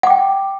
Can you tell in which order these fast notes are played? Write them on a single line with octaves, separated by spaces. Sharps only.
F#5 D6 G5